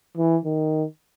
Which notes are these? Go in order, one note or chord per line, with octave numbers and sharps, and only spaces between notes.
E3
D#3